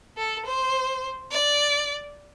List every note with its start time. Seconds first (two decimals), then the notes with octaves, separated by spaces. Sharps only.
0.17 A4
0.46 C5
1.31 D5